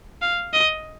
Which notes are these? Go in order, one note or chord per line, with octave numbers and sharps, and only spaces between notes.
F5
D#5